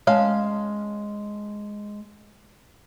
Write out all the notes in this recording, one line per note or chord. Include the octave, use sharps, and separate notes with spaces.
G#3 C#4 F5 A5